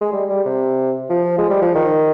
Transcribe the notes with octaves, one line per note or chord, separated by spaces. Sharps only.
G#3
G3
G3
C3
F3
G#3
G3
F3
D#3